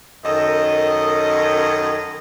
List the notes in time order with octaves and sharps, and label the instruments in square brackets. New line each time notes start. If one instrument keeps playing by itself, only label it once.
[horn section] F#2 D#3 A4 D#5